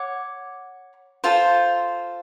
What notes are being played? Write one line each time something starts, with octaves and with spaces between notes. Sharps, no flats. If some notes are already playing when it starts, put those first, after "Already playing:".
Already playing: C#5 F#5 D6
F4 A4 C5